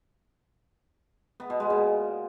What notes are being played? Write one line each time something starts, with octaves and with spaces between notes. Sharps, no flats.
B3
B2
G#3
A#2